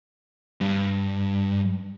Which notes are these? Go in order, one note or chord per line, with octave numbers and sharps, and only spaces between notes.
G2